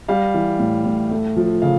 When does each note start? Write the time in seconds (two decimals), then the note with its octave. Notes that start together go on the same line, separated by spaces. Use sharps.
0.08 G3 F5
0.34 E3
0.59 A2
0.85 A2
1.11 A3
1.36 F3
1.62 C#3 F5